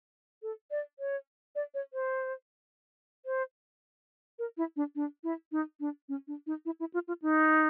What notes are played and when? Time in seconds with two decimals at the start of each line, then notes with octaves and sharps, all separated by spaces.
0.43 A4
0.71 D5
0.99 C#5
1.55 D5
1.74 C#5
1.93 C5
3.26 C5
4.39 A#4
4.57 E4
4.76 D4
4.95 D4
5.24 E4
5.52 D#4
5.80 D4
6.09 C#4
6.27 D4
6.47 D#4
6.65 E4
6.80 E4
6.94 F4
7.08 F4
7.22 D#4